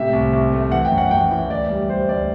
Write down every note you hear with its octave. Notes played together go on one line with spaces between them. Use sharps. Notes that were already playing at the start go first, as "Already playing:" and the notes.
Already playing: A2 C3 E5
C2
C2
A3
E3 F#5
G5
F#2
F#5
F#2 G5
E3
D2 D5
G3
G3 C5
D2 D5